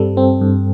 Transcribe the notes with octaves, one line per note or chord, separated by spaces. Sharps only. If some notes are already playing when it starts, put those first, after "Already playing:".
Already playing: G2 G3 C4 A4
C4
G2